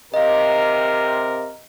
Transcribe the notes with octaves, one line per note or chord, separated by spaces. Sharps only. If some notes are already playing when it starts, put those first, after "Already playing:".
C3 A#4 D#5 F5